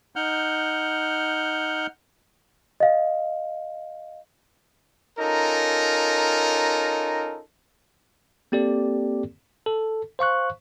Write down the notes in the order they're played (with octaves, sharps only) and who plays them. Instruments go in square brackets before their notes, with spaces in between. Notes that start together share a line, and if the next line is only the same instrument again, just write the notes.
[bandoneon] D#4 F#5 F6 G6
[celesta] D#5 F5
[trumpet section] C#4 D#4 F4 A4 A#4
[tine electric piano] A#3 C4 G4 A4 D5
A4
C5 F5 C#6 F#6